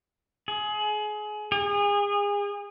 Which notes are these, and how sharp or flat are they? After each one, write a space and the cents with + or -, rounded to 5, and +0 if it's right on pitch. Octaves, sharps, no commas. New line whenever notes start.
G#4 +25
G#4 -30